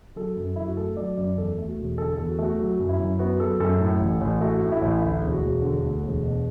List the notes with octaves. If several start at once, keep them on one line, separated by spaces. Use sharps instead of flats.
F#3 A4
F#2
F#2 E4
F#4
A3 A4
F#3 D5
F#2 D5
E2 A4
A3
F#4
E1
D3 A4
A4
E2
F#4
A3
F#4
F#3 F#4
F#2
E4
F#2
B3 F#4
F#3 A4
F#2 A4
A2
A1
A1
A3 F#4
A2
E4
A1
D2 E4
E1
F#4
E1
D3
D2
E1
B2